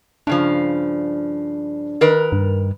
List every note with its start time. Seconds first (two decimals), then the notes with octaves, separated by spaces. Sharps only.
0.27 G2 C#3 F3 D4
2.01 D#3 A#4 B4
2.32 G2